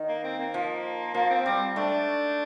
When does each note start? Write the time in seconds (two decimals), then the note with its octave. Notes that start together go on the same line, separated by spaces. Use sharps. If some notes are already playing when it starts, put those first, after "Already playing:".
Already playing: D#3
0.08 A#3
0.24 C4
0.39 A#3
0.54 F3
1.14 F3 A#3
1.30 C4
1.46 G3 C4
1.76 A3 D4